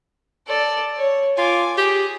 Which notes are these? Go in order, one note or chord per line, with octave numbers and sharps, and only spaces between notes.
A4 D5
C#5
F4 G#5 D6
G4 G#4